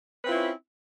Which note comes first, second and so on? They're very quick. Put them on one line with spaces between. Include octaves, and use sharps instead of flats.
B4 C4 F4 E4 C#4